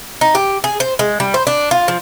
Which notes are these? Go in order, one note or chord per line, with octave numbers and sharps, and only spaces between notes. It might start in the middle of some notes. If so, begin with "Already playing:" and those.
D#4
G4
G#4
C5
G#3
G3
C5
D4
F4
F3